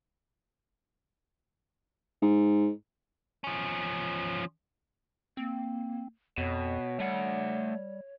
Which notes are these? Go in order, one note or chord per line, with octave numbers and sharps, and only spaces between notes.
G#2
F3 C#4
A#3 C4
F2 B2 C#5
G3 A3 F#5